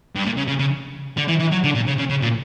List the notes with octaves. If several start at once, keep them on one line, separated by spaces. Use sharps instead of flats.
G2
A#2
C#3
C#3
C#3
D3
E3
E3
F#3
D3
A#2
C#3
C#3
C#3
A#2